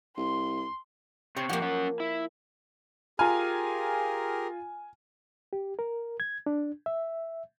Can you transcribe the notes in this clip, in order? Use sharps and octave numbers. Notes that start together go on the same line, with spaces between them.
C2 C6
C3 C4 C#5
F2 F3 A#3 G4 F#5
C#4 F#5
E4
F4 G4 G#4 A#4 G#5 A#5 F6
G4
A#4
G#6
D4
E5